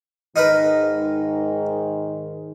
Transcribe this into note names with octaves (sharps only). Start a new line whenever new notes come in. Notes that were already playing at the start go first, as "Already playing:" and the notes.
G#2 D#3 D#4 A#4 B4